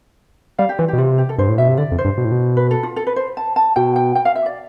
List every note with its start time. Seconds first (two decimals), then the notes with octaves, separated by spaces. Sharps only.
0.58 G3 F5
0.69 G4
0.78 E3 F4
0.88 B2 G4
0.98 C3 F4
1.18 G4
1.29 A4
1.38 G2 C5
1.49 A2
1.58 B2 E5
1.68 C3
1.77 D3 D5
1.91 F2
1.98 C5
2.05 G2
2.18 B2
2.25 A2
2.32 B2
2.57 B4
2.71 A4
2.83 F4
2.96 A4
3.07 B4
3.16 C5
3.37 A5
3.56 A5
3.76 B2 G5
3.96 G5
4.15 G5
4.25 F5
4.35 E5
4.46 D5